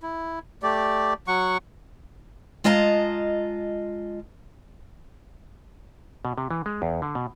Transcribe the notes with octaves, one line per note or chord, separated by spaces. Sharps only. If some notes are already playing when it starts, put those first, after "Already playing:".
E4
A3 G4 D5
F#3 F#5 C#6
G#3 F4 D#5 A5 A#5
B2
C3
E3
G#3
E2
D3
B2